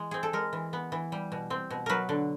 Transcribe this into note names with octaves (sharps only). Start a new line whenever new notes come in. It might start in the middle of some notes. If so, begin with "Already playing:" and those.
Already playing: E3 G#3
C4 G#4
A4
G#3 A#4
E3
B3
E3
G3
B2
C4
B2
F#3 A#4 B4
D3